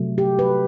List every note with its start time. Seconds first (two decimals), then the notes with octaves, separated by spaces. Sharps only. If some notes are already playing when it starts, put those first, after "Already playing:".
Already playing: C3 F#3 A3
0.18 G4
0.39 B4